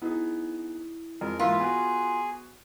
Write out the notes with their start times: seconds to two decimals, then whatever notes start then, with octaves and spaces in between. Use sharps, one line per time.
0.02 B3 D#4 E4 G#4
1.21 F2 G#3 A#4
1.39 G#2 E3 A#3 F4 A#4 B4 E5
1.60 B3 F#4 G#4 G#5